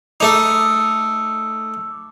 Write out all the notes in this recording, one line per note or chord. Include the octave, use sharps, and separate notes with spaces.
A3 D#4 D6 E6